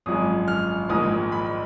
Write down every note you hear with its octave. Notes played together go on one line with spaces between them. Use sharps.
G#1 F#2 F3 G#3 D#6
F6
A#1 G#2 D#3 G#3 D#6
B5